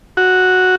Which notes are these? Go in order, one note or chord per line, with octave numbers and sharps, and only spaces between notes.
F#4